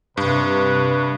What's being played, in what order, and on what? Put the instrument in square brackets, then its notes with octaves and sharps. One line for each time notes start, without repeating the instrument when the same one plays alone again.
[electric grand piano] G2 [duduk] C3 [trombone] B4